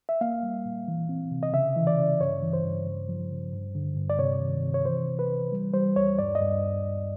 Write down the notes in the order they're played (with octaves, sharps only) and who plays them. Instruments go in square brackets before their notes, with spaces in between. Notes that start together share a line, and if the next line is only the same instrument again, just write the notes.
[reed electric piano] E5
A#3 F5
G3
A#2
E3
C4
C3
D#5
C#3 E5
E3
D5
C#3
G2 C#5
E3
C5
G2
C#3
F3
C#3
G2
D3
G2
D5
C3 C#5
D#3
C3
C#5
E3 C5
E3
B4
E3
G3
G3 C5
D#2 C#5
G2 D5
D#5
G2